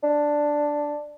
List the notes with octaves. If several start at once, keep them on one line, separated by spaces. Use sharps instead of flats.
D4